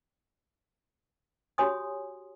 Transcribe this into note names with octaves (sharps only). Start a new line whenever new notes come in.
F#4 G4 C#5 G#5 C6 D#6